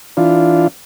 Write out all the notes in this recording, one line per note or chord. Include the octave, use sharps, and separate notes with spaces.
E3 D4 F4